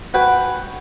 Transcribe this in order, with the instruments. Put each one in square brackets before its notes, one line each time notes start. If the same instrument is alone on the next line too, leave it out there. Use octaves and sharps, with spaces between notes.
[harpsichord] F#4 B4 G5 G#5